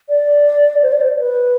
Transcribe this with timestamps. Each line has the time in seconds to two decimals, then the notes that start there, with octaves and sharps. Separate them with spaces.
0.09 D5
0.83 C5
0.92 D5
1.01 C5
1.18 B4